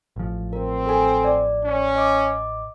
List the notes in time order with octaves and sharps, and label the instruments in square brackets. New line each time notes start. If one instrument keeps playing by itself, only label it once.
[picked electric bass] A1 F3
[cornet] C4 [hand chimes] A#4
[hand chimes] A4 G#5
D5
[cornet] C#4
[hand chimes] D#5 D6